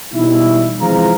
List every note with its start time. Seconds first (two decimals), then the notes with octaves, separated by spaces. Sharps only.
0.14 B2 E3 G3 D#4 E4
0.80 C3 E3 F3 G#3 F4 A#5